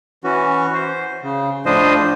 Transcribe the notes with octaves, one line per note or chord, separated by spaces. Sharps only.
E3 C#4 F#4
C5
C#3
A2 F3 D4 C5 D#5